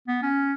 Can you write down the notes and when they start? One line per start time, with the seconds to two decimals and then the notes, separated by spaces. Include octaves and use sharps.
0.08 B3
0.23 C#4